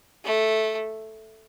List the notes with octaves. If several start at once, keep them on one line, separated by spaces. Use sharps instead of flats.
A3